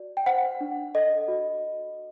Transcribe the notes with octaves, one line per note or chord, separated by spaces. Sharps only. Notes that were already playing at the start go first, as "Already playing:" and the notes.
Already playing: F#4 D5
G5
C5 F#5
D4
A4 D#5
F#4